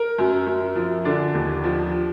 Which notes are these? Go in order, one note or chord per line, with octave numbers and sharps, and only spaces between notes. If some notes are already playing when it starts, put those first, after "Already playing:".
Already playing: A#4
F#2
F#2
F3
D3 D4
D#2
F3